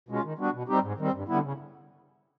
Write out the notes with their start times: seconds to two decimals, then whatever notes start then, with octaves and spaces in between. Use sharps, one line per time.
0.09 B2 G#3 C#4 F4
0.23 D#3
0.38 G3 B3 D4 F#4
0.53 B2
0.68 G3 C4 D#4 G4
0.83 G#2
0.98 D#3 G3 C4
1.13 G2
1.28 D3 G3 B3 E4
1.43 C#3